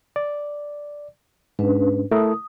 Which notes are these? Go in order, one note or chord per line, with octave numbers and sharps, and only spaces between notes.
D5
G#2 C#4 D4 B4
A3 E4 A#4 D#6